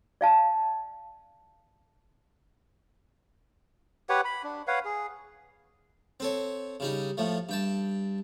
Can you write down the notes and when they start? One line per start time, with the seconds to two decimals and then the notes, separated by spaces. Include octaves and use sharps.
0.21 D5 F5 A5
4.09 G4 B4 C#5 F#5
4.25 B5
4.44 D4
4.67 B4 C#5 F5 F#5
4.85 G#4
6.20 C4 A4 C#5
6.80 C#3 G3 D#4
7.17 A2 F3 A3
7.49 G2 G5 A5